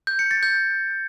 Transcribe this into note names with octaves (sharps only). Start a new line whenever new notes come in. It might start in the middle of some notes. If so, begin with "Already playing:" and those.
G6
C#7
A6
G6